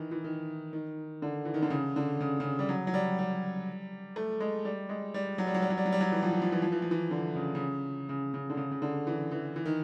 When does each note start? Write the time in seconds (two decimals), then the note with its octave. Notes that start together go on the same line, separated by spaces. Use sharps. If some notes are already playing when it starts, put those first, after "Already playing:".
Already playing: D#3 E3
0.11 E3
0.24 D#3
0.73 D#3
1.22 D3
1.45 E3
1.54 D#3
1.62 D3
1.70 C#3
1.96 D3
2.21 C#3
2.40 C#3
2.59 G3
2.69 F#3
2.87 F#3
2.94 G3
3.19 G3
4.16 A3
4.40 G#3
4.65 G3
4.89 G#3
5.14 G3
5.38 F#3
5.47 G3
5.55 F#3
5.62 G3
5.70 F#3
5.78 G3
5.86 F#3
5.92 G3
6.01 F#3
6.12 E3
6.23 F3
6.33 E3
6.42 F3
6.52 E3
6.62 F3
6.72 E3
6.82 F3
6.91 E3
7.11 D3
7.36 C#3
7.55 C#3
8.09 C#3
8.34 C#3
8.50 D3
8.57 C#3
8.71 C#3
8.82 D3
9.07 E3
9.32 E3
9.56 E3
9.66 D#3